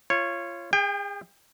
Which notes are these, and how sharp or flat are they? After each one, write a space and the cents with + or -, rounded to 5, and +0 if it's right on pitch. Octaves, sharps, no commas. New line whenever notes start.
F4 -25 C#5 -10
G#4 -35 G5 +30